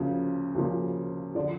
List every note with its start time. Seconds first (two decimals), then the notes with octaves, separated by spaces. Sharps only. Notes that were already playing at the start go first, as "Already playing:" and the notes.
Already playing: D2 C#3 F3 A#3
0.55 D2 C#3 F3 A#3
1.35 D3 F3 D5